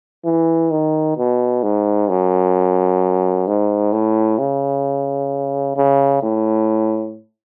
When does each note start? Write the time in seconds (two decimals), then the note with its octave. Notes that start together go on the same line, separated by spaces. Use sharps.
0.25 E3
0.71 D#3
1.17 B2
1.63 G#2
2.09 F#2
3.47 G#2
3.92 A2
4.39 C#3
5.77 C#3
6.23 A2